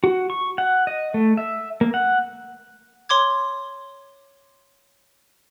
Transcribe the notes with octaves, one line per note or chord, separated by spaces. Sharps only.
F#4
C#6
F#5
D#5
A3
E5
A#3
F#5
C#5 C6 D6 G#6